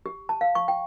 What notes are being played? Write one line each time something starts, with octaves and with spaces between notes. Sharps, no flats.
G4
A5
F5
C#6
G5